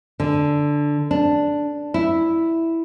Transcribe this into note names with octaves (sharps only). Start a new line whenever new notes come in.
D3
D4
E4